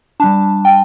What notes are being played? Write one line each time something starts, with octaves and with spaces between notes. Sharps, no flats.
G3 D4 A5
G5